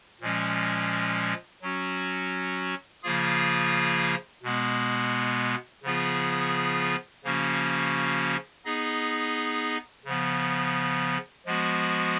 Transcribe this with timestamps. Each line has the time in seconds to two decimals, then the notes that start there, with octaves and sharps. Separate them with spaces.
0.21 A#2 F3 G#3 C#4
1.62 F#3 C#4 F#4
3.03 C#3 F3 A#3 F4 G#4
4.43 B2 G#3 B3
5.83 C#3 F3 B3 F4 G#4
7.24 C#3 F3 A#3 C#4 F#4
8.65 B3 D#4 G#4 D#5
10.05 C#3 F3 B3
11.46 F3 G#3 B3 F#4